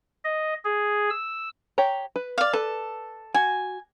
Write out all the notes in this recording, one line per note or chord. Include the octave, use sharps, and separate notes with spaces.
D#5
G#4
E6
G4 C#5 A#5
B4
D5 F5
A4 B4
F#4 G#5